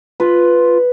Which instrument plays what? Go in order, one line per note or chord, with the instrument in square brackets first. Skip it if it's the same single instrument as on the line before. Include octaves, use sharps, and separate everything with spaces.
[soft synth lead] F4 [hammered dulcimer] B4